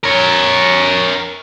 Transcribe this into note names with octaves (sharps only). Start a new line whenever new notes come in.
A#4 C#5